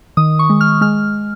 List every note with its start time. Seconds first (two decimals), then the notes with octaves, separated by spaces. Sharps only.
0.17 D#3 D#6
0.39 C#6
0.50 G#3
0.61 F6
0.81 G#3 F6